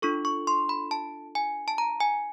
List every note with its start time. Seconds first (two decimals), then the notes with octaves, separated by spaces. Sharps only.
0.02 D4 F4 A4 C#6
0.25 C#6
0.47 C6
0.69 B5
0.91 A5
1.35 G#5
1.68 A5
1.78 A#5
2.00 G#5